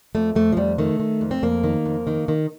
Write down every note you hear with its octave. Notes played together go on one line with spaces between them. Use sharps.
F2 A3
F2 A3
F3
F2 G3
D#3 A3
D#3
F2
C4
F2 A#3
D#3
F2
D#3
D#3